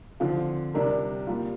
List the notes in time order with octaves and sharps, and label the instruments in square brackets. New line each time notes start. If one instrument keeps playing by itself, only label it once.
[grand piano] D3 F3 C4 F4
C3 G3 D4 A#4
G3 A#3 F4